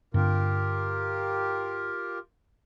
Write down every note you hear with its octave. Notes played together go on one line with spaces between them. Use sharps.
G2 D3 C4 F4 G4 A#4